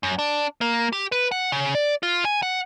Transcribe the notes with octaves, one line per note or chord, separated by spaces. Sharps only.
F#2
D4
A#3
G4
B4
F#5
C#3
D5
F4
G#5
F#5